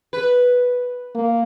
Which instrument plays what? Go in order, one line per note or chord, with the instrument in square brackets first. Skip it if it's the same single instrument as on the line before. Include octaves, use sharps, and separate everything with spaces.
[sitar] B4
[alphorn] A#3